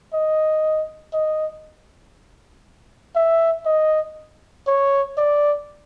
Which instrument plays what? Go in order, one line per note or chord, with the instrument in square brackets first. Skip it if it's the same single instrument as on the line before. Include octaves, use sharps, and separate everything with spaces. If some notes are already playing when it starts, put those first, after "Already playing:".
[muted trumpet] D#5
D#5
E5
D#5
C#5
D5